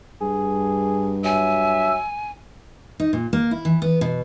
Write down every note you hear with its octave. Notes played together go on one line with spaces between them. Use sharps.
G2 G#4
F#3 E5 G#5
D#4
A#2
A#3
E4
E3
B3
B2